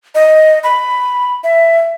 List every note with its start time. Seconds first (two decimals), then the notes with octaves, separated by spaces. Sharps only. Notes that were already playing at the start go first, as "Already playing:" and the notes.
0.15 D#5
0.64 B5
1.44 E5